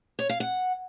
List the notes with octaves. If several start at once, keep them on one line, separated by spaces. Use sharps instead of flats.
C#5
F5
F#5